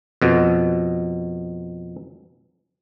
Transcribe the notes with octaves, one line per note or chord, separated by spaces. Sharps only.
F2 B2